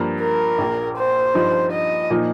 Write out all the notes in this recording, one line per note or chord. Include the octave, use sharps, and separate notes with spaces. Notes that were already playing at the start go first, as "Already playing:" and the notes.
Already playing: G2 F3 A#3
A#4
A#1 A#2 A#3
C5
G2 F3 D#4
D#5
A#2 F3 D#4